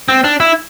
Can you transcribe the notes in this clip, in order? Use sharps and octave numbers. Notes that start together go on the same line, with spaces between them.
C4
D4
E4